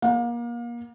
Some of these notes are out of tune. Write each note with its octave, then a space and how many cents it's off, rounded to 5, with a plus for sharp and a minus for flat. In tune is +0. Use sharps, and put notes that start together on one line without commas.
A#3 +30 F5 +35